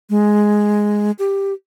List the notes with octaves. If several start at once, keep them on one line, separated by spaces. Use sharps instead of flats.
G#3
G4